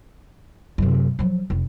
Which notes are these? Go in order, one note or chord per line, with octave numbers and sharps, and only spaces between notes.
F#2 C3
F3 F#3
F1